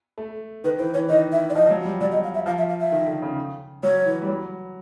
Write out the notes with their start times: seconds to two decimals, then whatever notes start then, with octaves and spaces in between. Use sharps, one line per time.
0.18 A3
0.64 D#3 B4
0.79 E3 C5
0.94 E3 C#5
1.09 D#3 D#5
1.32 E5
1.50 D5
1.54 F3 D#5
1.66 F3
1.71 F#3
1.85 G3
2.01 F#3 D5
2.12 D#5
2.24 F5
2.34 E5
2.46 F3 F5
2.58 E5
2.69 F5
2.80 E5
2.92 D#3
3.07 D3
3.22 C#3
3.83 F#3 C#5
4.06 E3
4.22 G3
4.28 F#3